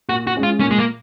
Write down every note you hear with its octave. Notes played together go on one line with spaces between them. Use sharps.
A#2 F#4
F#4
G#3 C#4
F4
A#2 C#4
G#3
A#3